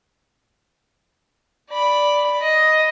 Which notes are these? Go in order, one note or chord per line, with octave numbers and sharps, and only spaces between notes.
D5 B5
D#5